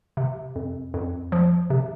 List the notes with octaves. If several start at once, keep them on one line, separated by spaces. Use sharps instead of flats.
C3
F2
F2
F3
C3